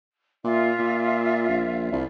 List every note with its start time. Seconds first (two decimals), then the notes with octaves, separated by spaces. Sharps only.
0.45 A#2 F4 E5
0.79 A#2
1.49 A#1
1.92 C2